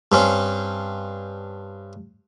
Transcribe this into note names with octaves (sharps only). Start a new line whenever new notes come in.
G2 C4 C#4